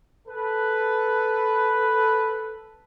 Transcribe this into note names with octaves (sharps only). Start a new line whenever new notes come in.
A4 B4